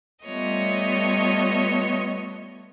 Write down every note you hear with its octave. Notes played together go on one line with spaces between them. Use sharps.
G3 A3 B3 F4 C#5 D#5